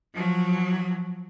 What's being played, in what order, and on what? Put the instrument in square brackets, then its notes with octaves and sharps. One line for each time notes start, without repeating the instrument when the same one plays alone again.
[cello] F3 F#3